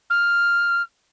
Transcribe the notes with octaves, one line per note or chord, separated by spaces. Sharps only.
F6